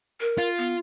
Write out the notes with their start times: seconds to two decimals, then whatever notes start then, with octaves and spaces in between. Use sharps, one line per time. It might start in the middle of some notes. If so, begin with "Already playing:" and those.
0.21 A#4
0.38 F4
0.58 B3